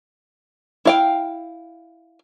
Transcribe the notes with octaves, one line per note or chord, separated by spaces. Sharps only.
E4 F5 G5